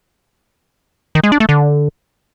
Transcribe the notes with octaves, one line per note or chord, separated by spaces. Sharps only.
D#3
G#3
D4
A3
D3